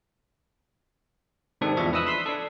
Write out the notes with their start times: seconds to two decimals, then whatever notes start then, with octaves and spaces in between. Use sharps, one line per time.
1.61 G#2 C3 D#3 C4 D4 A4
1.77 E2 F3 D4 D#5 E5 C#6
1.93 B4 D#5 E5 D#6 E6 F#6
2.07 B5 C6 E6 B6
2.26 D4 A4